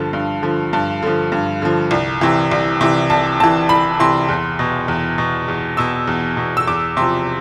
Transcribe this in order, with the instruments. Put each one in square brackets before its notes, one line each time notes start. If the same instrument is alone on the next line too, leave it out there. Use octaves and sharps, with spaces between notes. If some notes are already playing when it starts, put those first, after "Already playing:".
Already playing: [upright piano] G2 D3 F3 A5
G2
D3 F3
G2 A5
D3 F3
G2
D3 F3
C2
C3 E3
C2
C3 E3
C2 A5
C3 E3 A5
C2 B5
C3 E3 C6
E2
B2
E2
B2
E2
B2 E6
E2
B2
E6
E2 D6
C3 F3 C6